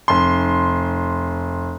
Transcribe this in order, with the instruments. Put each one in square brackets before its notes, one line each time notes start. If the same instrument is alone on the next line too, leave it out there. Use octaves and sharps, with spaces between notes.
[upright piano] F1 C6